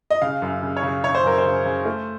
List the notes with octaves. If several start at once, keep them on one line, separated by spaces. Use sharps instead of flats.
D#5
C#3 F5
F#2
C#3
C#5
C#3
C#3 C#5
C5
F#2 A#4
C5
C#3
C#3
A3